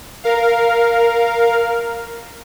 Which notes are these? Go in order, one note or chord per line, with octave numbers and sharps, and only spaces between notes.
A#4 F5